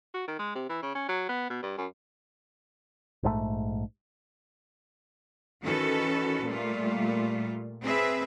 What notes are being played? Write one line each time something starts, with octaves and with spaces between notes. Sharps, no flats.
F#4
D#3
G#3
C3
E3
C#3
C#4
F#3
B3
B2
G2
F#2
A#1 G#2 E3 A3
D#3 E3 C#4 F#4 A4 B4
A#2 G3 A3 F4
C4 G#4 B4 E5